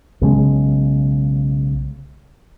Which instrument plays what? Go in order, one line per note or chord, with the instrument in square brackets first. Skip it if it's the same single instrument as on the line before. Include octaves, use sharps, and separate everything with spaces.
[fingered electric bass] B1 C#3 G#3